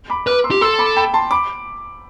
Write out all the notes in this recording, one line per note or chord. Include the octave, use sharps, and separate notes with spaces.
B5 D6
B4 D6 F6
C6 E6
G4
A4 C6 E6
B5 D6
G5 B5
A5 C6
B5 D6